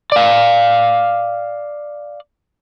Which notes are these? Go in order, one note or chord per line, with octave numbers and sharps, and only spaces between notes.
D5 F5